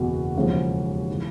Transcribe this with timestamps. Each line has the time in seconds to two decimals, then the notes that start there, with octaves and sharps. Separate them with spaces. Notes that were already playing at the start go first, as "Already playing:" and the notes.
Already playing: F#1 E2 B2 F#4
0.36 E1 D#2 C#3 F3
1.11 E3